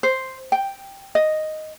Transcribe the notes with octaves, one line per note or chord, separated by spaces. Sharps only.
C5
G5
D#5